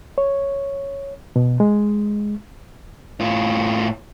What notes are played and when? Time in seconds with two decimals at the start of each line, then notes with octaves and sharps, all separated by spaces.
0.18 C#5
1.36 B2
1.60 G#3
3.20 A2 F4